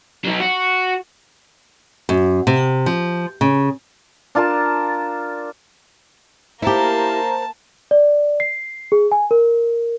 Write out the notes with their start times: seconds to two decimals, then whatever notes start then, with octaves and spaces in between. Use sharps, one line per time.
0.25 F#3 D#4
0.40 F#4
2.09 F#2
2.47 C3
2.86 F3
3.41 C#3
4.35 D4 F4 A#4 A5
6.62 A#3 E4 G4 A#4 C5 A5 A#5
7.91 D5
8.40 C7
8.92 G#4
9.12 G#5
9.31 A#4